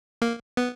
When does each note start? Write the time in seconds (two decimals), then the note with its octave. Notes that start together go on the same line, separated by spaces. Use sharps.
0.22 A#3
0.57 B3